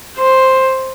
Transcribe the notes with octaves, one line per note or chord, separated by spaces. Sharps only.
C5